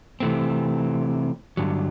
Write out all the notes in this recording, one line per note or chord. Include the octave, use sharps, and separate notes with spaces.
C3 E3 A3 C4
G2 D3 F#3